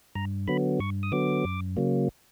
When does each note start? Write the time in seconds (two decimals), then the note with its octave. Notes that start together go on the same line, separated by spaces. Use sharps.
0.15 G2 A#5
0.47 D3 F#3 B3 B5
0.80 G2 C#6
1.03 D#6
1.12 D3 F#3 B3 D6
1.44 F#2
1.77 C#3 F#3 A#3